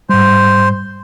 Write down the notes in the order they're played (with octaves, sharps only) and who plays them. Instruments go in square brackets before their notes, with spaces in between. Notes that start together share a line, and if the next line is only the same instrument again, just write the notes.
[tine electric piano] G#2 G3 [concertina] C5